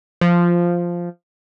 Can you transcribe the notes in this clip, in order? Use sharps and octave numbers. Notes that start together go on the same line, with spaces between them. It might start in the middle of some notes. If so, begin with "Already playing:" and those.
F3